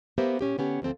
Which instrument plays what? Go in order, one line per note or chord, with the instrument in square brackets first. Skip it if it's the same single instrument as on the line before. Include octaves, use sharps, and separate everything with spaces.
[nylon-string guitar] A#3 B3 G4 A#4 C5 E5
A#2 C#4 G4
D3 B3 C#4 G4
D2 F3 C4 A4